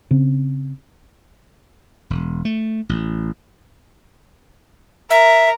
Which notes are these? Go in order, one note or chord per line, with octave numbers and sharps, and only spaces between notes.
C#3 C4
E1
A3
A1
A#4 E5